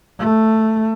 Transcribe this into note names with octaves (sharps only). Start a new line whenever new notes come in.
A3